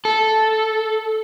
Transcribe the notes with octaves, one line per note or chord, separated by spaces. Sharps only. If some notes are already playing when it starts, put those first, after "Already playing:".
A4